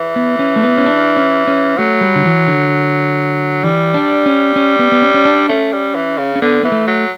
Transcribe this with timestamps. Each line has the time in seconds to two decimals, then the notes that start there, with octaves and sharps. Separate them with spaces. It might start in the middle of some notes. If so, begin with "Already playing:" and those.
Already playing: E3
0.16 B3
0.39 C#4
0.56 A3
0.63 B3
0.78 C#4
0.86 D4
1.17 C#4
1.47 C#4
1.78 F#3 A3
2.01 G3
2.15 D3
2.25 E3
2.47 D3
3.64 E3 G3
3.94 D4
4.26 C#4
4.56 C#4
4.79 B3
4.92 B3
5.02 C#4
5.14 C#4
5.25 D4
5.49 A3 C#4
5.73 G3
5.95 E3
6.18 C#3
6.36 C#4
6.42 D3 B3
6.63 E3 B3
6.72 A3
6.87 F#3